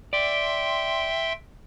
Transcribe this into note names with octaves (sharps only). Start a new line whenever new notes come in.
D5 E5 G5 C6